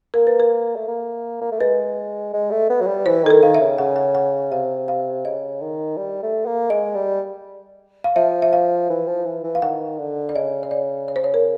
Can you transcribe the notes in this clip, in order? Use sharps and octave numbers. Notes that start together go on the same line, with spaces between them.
A#3 A#4
B4
A#4
A3
A#3
A#3
A3
G#3 B4
G#3
A3
B3
F#3
G3
E3 C5
D#3 A4
A#4
D#3 F5
E5
C#3
C#3 F#5
F#5
F#5
C3 F5
F5
C#3 D#5
D#3
G3
A3
A#3
G#3 D#5
G3
F5
F3 E5
E5
F5
E3
F3
E3
E3
F5
D#3 F#5
D3
D5
C#3 D#5
C#5
D5
C#5
C5
C#5
A#4